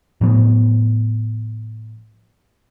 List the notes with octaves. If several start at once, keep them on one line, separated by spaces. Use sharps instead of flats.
A2 F3 B3